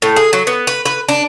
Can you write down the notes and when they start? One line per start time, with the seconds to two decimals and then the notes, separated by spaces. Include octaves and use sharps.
0.02 A2
0.16 G#4
0.33 F#3
0.47 B3
0.67 B4
0.85 B4
1.09 D4